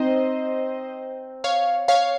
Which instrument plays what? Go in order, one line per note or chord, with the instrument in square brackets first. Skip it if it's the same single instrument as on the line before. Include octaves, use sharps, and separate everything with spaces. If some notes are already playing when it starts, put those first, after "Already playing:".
Already playing: [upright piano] C4 D#4 [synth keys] C5 D#5
[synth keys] C#5 F5
C#5 F5